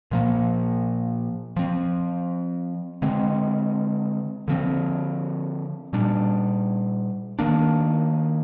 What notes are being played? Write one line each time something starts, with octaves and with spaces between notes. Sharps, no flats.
A#2 F3 A#3
F3 C4
D3 G#3 C4
D3 F3 C4
A#2 G3 D4
D#3 A#3 D4